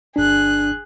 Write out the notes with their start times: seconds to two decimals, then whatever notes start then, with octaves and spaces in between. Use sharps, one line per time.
0.16 G1 D4 G#4 F#6